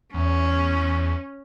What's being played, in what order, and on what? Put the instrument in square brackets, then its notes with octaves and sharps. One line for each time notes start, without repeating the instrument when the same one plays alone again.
[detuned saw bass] E2 [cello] C#4